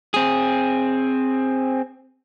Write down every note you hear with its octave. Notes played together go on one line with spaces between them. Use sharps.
C4 G#4